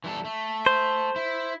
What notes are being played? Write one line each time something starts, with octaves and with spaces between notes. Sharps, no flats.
E3 G3 A4
A3
C5
E4